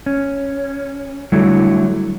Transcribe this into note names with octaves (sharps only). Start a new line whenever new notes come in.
C#4
D3 F#3 G3 A3 E4